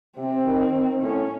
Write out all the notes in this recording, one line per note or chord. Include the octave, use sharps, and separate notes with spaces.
C3 C4
D#3
D#3
A2 C#4